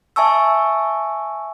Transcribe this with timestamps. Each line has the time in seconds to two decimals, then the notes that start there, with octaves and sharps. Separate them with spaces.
0.16 E5 G#5 A5 C#6 E6